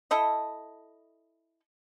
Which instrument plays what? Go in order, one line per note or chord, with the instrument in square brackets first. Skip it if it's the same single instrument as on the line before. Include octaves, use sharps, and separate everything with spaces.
[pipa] E4 A4 D#5